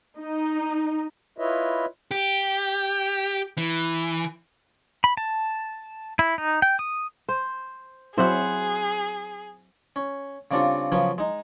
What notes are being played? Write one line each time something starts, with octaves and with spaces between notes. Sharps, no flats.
D#4
E4 F4 B4 C#5 D#5 E5
G4
E3
B5
A5
E4
D#4
G5
D#6
C5
F#3 C4 E4 G#4 C5 E5 F#5
C#4
C#3 G3 C4 D4 F4 A4
C#3 F3 F#3 B3 C#4
G#3 D#4